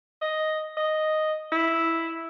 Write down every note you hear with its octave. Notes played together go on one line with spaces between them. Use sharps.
D#5
D#5
E4